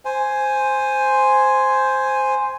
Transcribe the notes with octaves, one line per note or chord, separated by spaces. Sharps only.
C5 G#5